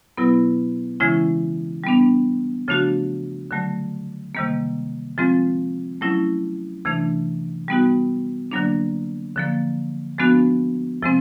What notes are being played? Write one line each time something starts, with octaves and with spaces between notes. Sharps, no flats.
B2 F#3 B3 E4
C#3 E3 G#3 C#4 E4
G3 B3 D4
C#3 F3 A3 D4 F#4
D3 F#3 A3
C3 D#3 G3 A#3
F3 G#3 C4 F4
F#3 A3 C#4 E4
C3 E3 A3 D4
G3 B3 D#4 F#4
D3 F#3 A#3 D4
D3 F3 A#3
F3 G#3 B3 D4 F#4
C3 F3 G#3 C4